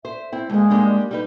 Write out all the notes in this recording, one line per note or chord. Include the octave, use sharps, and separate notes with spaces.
C5 E5
C4 E4
D2 G#3 A#3
G3 A#3 D4
G3 D#4 B4